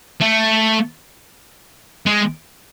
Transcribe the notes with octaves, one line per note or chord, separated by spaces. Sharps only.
A3
G#3